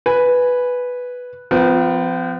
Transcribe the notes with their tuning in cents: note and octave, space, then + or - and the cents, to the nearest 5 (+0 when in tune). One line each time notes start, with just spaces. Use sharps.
B4 +0 G#5 +0
F3 +0 C4 -45 B4 -45